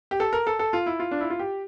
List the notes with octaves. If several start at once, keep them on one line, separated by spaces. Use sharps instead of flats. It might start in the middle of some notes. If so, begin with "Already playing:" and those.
G4
A4
A#4
A4
A4
F4
E4
F4
D4
E4
F4
G4